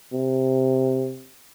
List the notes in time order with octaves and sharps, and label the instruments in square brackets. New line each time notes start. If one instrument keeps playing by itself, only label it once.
[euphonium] C3